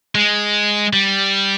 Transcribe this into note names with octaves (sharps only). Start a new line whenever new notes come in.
G#3
G3